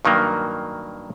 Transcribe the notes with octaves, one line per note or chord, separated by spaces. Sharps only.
G2 D#3 F#3 A#3